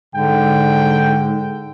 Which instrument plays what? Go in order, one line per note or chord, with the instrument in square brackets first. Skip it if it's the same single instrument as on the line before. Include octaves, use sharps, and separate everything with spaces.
[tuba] G#2 [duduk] D3 [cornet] G5